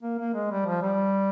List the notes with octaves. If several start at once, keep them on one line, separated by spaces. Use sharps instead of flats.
A#3
A#3
G#3
G3
F3
G3